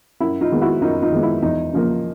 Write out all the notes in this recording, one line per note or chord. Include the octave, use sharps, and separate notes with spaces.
F#2 E4
D#4 F4
D#3 G#3 B3
E4 F#4
F#2 D#4 F4
D#4 F4
D#3 G#3 B3
E4
E2 D#4
C#3 F3 A#3